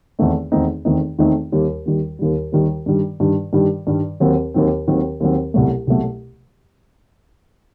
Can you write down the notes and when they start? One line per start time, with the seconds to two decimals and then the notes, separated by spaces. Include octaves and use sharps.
0.19 E2 D#3 A3 C4 D#4
0.52 E2 D#3 A3 C4 D#4
0.85 E2 D#3 A3 C4 D#4
1.18 E2 D#3 A3 C4 D#4
1.52 D#2 D#3 G3
1.85 D#2 D#3 G3
2.19 D#2 D#3 G3
2.52 D#2 D#3 G3
2.86 G2 D#3 G3
3.20 G2 D#3 G3
3.53 G2 D#3 G3
3.87 G2 D#3 G3
4.20 D#2 D#3 F#3 C4
4.54 D#2 D#3 F#3 C4
4.88 D#2 D#3 F#3 C4
5.20 D#2 D#3 F#3 C4
5.54 C2 B2 F#3 A3
5.87 C2 B2 F#3 A3